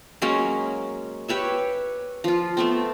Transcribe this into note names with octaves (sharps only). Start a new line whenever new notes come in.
F#3 G#3 A#3 C#4
G4 B4 C#5 E5
F3 F4
A3 B3 C4